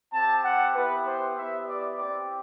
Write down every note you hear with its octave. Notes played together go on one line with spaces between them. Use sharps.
C4 G4 A5
F#5
B3 E4 G4 B4
C5
B3 E4 G4 E5
D5
C4 G4 D5